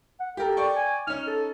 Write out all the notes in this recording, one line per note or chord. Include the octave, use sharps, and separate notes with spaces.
F#5
G4 A4 A#4
D5 G5 C#6
G#5
C#4 D#4 F6
A4